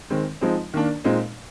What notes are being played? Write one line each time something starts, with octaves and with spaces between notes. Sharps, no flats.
D#3 G#3 C4
F3 G#3 C4 D#4
D#3 A#3 D4
A#2 G#3 C4 D#4